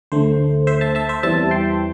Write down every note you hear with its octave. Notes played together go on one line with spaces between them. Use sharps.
D2 D3 A3 C5
C5 E5
E5 A5
E5 A5
C5 E5
E2 E3 G3 C4 E5 A5
G5 C6